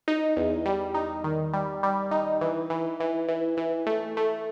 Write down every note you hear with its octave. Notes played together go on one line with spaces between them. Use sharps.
D#4
E2
G3
D#4
D#3
G3
G3
D#4
E3
E3
E3
E3
E3
A3
A3